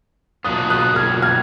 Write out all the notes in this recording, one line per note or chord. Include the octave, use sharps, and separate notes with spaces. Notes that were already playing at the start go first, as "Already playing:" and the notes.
B2 F#3 A#3 D4 F4 D#6 F#6
D#6 F#6
F6 G#6
F6 G#6